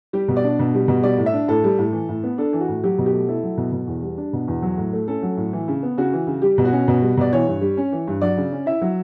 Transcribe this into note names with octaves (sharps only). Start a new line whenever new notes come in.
G3 G4
B2
D5
D4
B2
G3
B2
G3 D5
A2
E5
D4
A2 A4
G3
A2
E3
A2
B3
D4 A4
E3
F#4
A2
F#3 G4
B2
G4
A3
E4 A4
F#3
B2
B2
E2
G3
D4
B2
E2
F#3
A2
A3
C#4 A4
F#3
A2
E3
C#3
B3
C#3 F#4
E3
C#3
G3 G4
B2
F#4
C#4
B2
G3
B2 D5
E3 C#5
G2
G3
C#4
E3
G2
F#3 D5
C#3
C#4
E4 E5
F#3